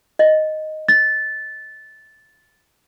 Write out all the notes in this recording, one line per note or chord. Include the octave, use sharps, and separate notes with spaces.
D#5
A6